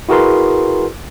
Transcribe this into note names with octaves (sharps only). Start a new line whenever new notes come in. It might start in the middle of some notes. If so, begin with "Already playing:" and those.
E4 F#4 G#4 A#4 B4 C6